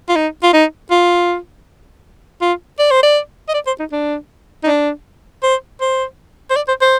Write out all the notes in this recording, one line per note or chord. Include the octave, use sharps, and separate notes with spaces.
F4
D#4
F4
D#4
F4
F4
D5
C5
D5
D#5
D5
C5
D#4
D4
D#4
D4
C5
C5
C5
D5
C5
C5